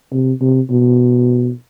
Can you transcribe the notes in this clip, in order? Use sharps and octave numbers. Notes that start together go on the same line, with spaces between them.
C3
C3
B2